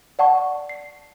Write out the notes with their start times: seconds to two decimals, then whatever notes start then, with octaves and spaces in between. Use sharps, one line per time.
0.19 D5 F#5 A5 C#6
0.69 C7